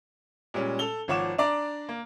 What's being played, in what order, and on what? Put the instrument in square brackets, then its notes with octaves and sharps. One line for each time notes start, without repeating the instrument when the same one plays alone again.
[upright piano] A#2 G3 G#3 C#4
A4 F7 G7
G#1 F3 C#5 F#5 D6 E7
D4 D5 A#5 D6
A#3